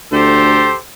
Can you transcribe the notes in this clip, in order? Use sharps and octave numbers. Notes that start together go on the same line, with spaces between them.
D2 G4 A4 C5